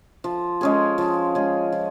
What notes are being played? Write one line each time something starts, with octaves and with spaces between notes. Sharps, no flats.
F3
G#3 C#4 G#4
F3
G#3 C#4 G#4
F3